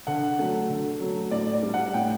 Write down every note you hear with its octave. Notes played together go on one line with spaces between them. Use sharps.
D3 F#5
F#3 A3
D3
F#3 A3
A2 D5
D5
G3
F#5
A2 G5